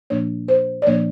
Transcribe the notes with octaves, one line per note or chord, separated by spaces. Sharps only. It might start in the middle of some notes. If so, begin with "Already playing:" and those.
A#2 F3 A#3 D4 C#5
C5
D5
A#2 F3 A#3 D4 C#5